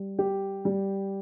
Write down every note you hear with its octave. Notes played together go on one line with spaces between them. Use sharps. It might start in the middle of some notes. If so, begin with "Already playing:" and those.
Already playing: G3
G4
G3